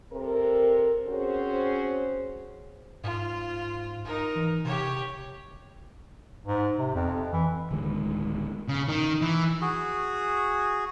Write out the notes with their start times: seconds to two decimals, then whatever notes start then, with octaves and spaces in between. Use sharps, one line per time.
0.13 C3 C4 A4 A#4
1.07 C4 C#4 F#4 G#4 C5
3.04 G#2 F4
4.05 D#4 A#4
4.35 E3
4.65 C3 G4 C#5
6.46 G#2
6.79 C3
6.95 F2
7.33 E3
7.71 D1 D3 D#3 G#3
8.68 C#3
8.89 D#3
9.22 E3
9.61 F#4 G#4